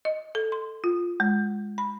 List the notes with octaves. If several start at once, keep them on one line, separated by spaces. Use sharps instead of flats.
D#5
A4
C6
F4
G#3
B5